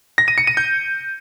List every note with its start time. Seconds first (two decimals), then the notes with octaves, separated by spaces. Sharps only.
0.18 A#6
0.28 D#7
0.38 C#7
0.47 D#7
0.57 G6